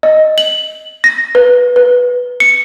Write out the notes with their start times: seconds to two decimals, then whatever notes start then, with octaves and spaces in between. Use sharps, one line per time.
0.03 D#5
0.38 F#7
1.04 A#6
1.35 B4
1.76 B4
2.40 C#7